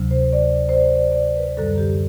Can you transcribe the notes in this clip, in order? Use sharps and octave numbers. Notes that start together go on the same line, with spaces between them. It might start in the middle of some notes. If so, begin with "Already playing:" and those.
Already playing: D2 C3 F#3
C5
D5
C5
D5
D5
D5
C5
B4
F#2 D3 G3 A4
G4